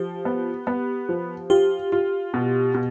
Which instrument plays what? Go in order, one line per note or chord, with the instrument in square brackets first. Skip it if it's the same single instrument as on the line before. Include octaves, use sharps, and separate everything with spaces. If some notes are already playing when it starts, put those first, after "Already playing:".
Already playing: [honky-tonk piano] F3 [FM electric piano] G4
[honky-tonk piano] B3
B3
F3
[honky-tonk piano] F4 [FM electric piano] G4
[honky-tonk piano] F4
B2
B2